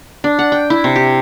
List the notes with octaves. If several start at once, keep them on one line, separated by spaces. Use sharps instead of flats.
D4
F#5
G5
E4
C3
G4